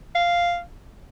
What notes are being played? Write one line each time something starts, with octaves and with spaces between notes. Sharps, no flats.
F5